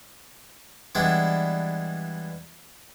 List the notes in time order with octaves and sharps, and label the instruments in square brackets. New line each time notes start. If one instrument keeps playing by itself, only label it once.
[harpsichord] E3 G3 G#3 B3 D4 E4